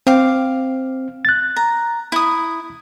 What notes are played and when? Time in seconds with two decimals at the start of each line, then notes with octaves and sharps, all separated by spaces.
0.07 C4 F5 D6
1.25 F#6 A6
1.56 A#5
2.12 E4 D#6